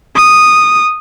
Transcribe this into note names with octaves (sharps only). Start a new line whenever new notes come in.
D#6